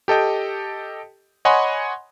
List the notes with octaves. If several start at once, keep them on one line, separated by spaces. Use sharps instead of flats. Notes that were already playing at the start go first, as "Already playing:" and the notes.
G4 A4 D#5 G5
C#5 D#5 F#5 G#5 B5 C6